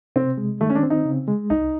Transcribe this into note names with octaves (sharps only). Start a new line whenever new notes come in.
C3 C4
G#3
D#3 A3
C#4
D4
C4
D#4
C#3
G#3
C2 D#4